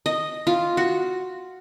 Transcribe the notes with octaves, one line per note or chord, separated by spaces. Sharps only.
D#5
F4
F#4